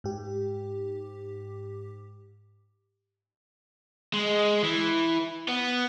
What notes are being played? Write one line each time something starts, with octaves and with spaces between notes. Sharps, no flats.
G#2 G4
G#3
E3
B3